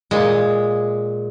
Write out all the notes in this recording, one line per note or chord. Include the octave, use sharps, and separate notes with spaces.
A#2 G#3